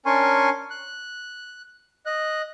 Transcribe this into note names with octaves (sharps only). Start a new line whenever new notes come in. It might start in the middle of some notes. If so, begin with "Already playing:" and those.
C#4 D4 A#4 G#5 C6 C#6
F#6
D#5 F#6